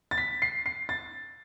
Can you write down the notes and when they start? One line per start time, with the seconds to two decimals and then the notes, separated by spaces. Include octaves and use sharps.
0.11 A6
0.18 B6
0.42 C7
0.66 C7
0.89 A6